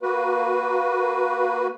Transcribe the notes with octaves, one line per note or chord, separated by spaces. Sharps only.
A#3 F#4 B4